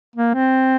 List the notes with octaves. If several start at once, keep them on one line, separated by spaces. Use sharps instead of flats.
A#3
C4